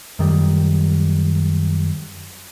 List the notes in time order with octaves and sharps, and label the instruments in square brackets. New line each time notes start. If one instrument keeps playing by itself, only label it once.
[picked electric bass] F#2 D#3 G3